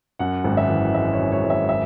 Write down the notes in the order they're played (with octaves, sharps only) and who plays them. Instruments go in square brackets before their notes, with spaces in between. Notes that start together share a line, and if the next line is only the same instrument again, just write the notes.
[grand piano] F#2 F#5
G#1
E5
E3
G#3 E5
C#5
F#2
C#5
G#1
E5
E5